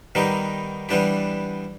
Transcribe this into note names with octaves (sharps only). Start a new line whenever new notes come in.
D#3 G3 B3 D#4 G4
E3 G3 B3 D4 G4